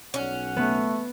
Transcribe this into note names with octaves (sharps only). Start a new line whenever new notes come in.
B1 C#4 F#5
A3 B3